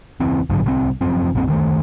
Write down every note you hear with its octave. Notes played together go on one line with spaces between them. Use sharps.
E1 C#3 E3 C4
A1 G2 D3 F#3
D1 C2 C4
F1 F#2 F3 C4
B1 F#2 A#2 C4
D2 D#3 A3